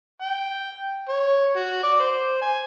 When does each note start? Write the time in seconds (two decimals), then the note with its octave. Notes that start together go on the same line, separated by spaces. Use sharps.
0.22 G5
1.09 C#5
1.56 F#4
1.84 D5
2.00 C5
2.42 G#5